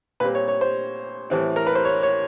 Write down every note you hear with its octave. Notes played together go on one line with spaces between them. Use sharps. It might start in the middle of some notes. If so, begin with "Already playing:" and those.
A#2 G3 C4 B4
C#5
C#5
C5
A2 E3 G3 C4
A#4
B4
C5
C#5
C#5